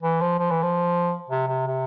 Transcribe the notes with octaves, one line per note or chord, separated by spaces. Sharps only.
E3
F3
F3
E3
F3
C3
C3
C3